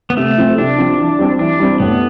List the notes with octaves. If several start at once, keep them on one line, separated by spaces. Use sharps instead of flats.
B3
C3 A3
F3 C4 F4
C3 D4
F3 C4 F4
E3
G3 C4
E3 D4
G3 C4
A2 B3